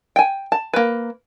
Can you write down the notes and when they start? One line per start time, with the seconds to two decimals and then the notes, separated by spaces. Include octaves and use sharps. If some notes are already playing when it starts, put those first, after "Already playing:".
0.16 G5 G#5
0.52 A5
0.74 A#3 B4